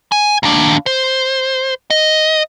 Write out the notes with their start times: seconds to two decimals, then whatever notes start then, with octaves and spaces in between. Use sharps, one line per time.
0.12 G#5
0.43 D#2 D4
0.86 C5
1.90 D#5